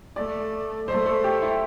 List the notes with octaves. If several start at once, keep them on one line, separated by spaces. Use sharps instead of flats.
A3 D5
A3 C5
A4
G4
E4